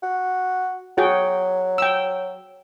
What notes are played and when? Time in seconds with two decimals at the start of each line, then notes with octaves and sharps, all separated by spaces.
0.03 F#4
0.98 F#3 F#4 G#4 G5
1.78 G5 E6